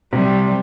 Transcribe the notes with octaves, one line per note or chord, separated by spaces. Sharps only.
C3 G3